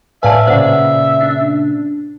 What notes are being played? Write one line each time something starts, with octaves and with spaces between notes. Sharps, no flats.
A2 B4 D5 E5 F5 G#5 A5
A#2 C#3 C5 D5 F#5
D4